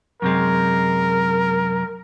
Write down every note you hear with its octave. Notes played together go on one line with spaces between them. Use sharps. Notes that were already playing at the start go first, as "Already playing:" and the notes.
F#2 C3 G#3 A#4